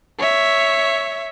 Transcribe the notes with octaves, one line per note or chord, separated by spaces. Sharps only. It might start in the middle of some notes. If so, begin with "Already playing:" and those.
C#5 E5